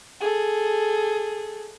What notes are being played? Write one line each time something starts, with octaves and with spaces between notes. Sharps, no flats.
G#4 A4